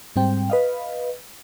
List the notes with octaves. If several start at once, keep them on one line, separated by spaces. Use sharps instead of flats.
G#2 G3 C4 G5
B4 D#5 F5